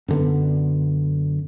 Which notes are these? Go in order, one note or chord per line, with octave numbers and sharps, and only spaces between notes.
F#2 D3 B3